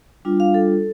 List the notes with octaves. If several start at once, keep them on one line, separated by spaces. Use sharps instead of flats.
G3 D4 F4
F5
A4